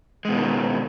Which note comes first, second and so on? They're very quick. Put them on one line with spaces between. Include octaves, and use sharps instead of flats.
G#3 B2 D3 D#3